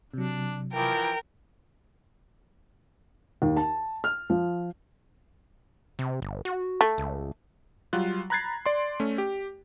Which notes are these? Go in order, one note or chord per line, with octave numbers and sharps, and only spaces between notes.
C3 F#3 D4
E3 F3 A#4 G5
D#2
A5
F6
F3
C3
G1
F#4
A3
C#2
F#3 G3 F4 F#6
A#5 B5 F#6 G#6 A6 C7
D5 C6
A3 C#4
G4